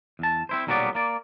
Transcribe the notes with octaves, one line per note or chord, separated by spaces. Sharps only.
E2 A5
C4 E4 C5
B1 A#2 F#3 G3 B3 D5
A#3 D5